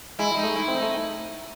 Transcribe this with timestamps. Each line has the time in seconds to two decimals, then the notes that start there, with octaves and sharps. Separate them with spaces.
0.19 G#3 E4
0.34 G#3 D#4
0.43 A3
0.56 E4
0.68 C4
0.75 D#4
0.82 A3